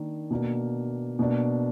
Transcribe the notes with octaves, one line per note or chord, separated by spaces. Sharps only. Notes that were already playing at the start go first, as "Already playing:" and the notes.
Already playing: D#3 A#3 D4
B2 A#3 D4
B2 A#3 D4